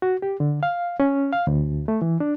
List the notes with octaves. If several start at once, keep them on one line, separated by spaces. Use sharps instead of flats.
F#4
G4
D3
F5
C#4
F5
D2
A3
E3
D4